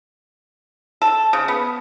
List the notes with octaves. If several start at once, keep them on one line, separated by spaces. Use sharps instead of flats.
A4
C#3
B3